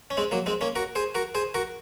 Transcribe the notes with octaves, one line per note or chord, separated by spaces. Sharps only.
C#4
G#3 C4
F#3 A#3
G#3 C4
A#3 C#4
F#4 A#4
G#4 C5
F#4 A#4
G#4 C5
F#4 A#4